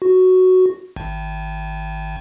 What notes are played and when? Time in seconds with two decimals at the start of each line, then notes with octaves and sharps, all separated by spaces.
0.02 F#4
0.96 G#1